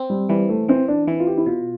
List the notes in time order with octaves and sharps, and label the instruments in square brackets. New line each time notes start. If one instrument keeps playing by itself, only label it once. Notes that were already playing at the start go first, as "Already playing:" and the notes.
Already playing: [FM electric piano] C4
[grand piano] G3
[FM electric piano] E3 [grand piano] G3
[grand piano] A3
[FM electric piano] E3 [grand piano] C4
[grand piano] D4
[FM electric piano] E3 [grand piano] E4
[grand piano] F4
G4
E4
[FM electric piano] B2 [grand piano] F4